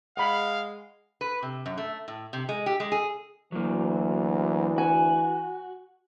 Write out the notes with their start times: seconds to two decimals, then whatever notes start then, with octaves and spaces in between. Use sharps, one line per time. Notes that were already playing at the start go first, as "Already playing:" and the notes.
0.17 G#3 F5 F#5 B5
1.21 B4
1.43 C3
1.66 F#2
1.78 A3
2.08 A2
2.33 C3
2.49 G#3
2.66 G4
2.80 G#3
2.92 G#4
3.52 D2 E3 F#3 A#3
4.78 F#4 G#5